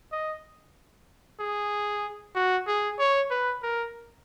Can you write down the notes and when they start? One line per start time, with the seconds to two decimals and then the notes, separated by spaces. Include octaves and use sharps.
0.12 D#5
1.40 G#4
2.35 F#4
2.67 G#4
2.99 C#5
3.31 B4
3.63 A#4